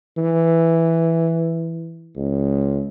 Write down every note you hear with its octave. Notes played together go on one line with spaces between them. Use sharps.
E3
C#2